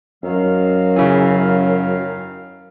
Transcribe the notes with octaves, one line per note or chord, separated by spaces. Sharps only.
F#2 D#3 F#3 F5
C#3 E3